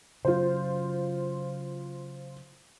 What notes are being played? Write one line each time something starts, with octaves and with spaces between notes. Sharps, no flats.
C#3 F#3 F4 C5